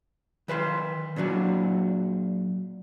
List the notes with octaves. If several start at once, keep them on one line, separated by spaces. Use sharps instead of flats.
D#3 B4 F#5 C6
A#2 F#3 D4 F#4